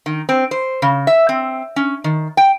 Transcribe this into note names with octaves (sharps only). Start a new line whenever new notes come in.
D#3
C4
C5
C#3
E5
C4
C#4
D#3
G5